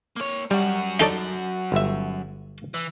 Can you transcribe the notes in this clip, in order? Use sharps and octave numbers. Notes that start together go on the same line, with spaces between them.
A#3 C#5
F#2 G3 F#4
D#4 A4 D5
G1 E5
E3